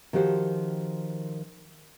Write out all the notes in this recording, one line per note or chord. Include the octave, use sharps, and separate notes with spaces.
D#3 F3 F#4 G4 C5